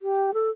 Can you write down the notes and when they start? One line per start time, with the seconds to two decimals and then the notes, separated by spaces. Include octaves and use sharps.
0.02 G4
0.34 A4